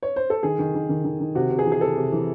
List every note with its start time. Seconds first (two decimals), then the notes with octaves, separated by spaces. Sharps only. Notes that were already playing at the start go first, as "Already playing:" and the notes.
0.03 C#5
0.16 C5
0.30 A4
0.43 D#3 G#4
0.59 D#3
0.75 D#3
0.89 D#3
1.04 D#3
1.20 D#3
1.35 C3 F#4
1.51 C3
1.59 G#4
1.65 E3
1.72 G#4
1.81 C3 A4
1.96 C3
2.12 E3